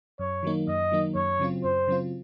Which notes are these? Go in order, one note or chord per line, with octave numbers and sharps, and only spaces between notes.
F#2 C#5
D#3 F#3 A#3 D#4
F#2 D#5
D#3 F#3 A#3 D#4
F#2 C#5
C#3 F#3 C4 F4
F#2 C5
C#3 F#3 C4 F4